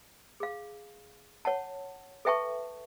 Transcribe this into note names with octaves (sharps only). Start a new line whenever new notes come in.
G#4 F5
C#5 F#5 A5
A4 B4 E5 G5 A5 C#6